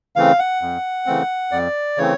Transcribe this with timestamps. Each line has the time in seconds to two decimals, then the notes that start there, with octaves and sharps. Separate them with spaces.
0.16 C#3 E3 A3 C4 F5
0.39 F#5
0.62 F2
1.06 C#3 E3 A3 C4
1.52 F2 D5
1.98 C#3 E3 A3 C4 C#5